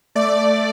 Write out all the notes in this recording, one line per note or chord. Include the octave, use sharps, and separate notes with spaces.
A3 D5